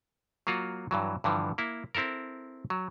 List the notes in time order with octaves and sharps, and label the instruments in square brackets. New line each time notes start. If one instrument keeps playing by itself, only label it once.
[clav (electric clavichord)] F#3 A#3 F4 F#4
G2 E3 F#3
G2 D3 E3 F3
A#3 E4
C4 E4 A4 A#4
F#3